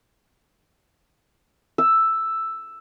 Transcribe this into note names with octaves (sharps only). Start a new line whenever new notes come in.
E6